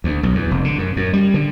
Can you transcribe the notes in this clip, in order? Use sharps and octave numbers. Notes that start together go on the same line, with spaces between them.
D2
B1
E2
F1
D3
F#2
F#2
G3
D3